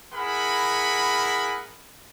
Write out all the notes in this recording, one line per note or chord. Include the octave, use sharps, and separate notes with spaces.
E4 G#4 A#4 F#5 B5